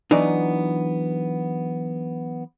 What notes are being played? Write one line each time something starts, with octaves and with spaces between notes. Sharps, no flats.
E3 F#3 B3 D4 D#4